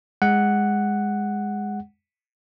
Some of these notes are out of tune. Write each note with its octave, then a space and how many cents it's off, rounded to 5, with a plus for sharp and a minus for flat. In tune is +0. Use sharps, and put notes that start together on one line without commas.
G#3 -15 F#5 +0